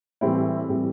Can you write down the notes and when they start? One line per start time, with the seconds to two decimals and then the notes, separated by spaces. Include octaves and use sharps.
0.21 A2 E3 G3 C4 E4
0.69 A2 E3 G3 C4 E4